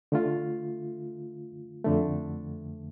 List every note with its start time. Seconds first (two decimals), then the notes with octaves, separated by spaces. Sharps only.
0.12 D3 A3 F4
1.84 F2 D3 A3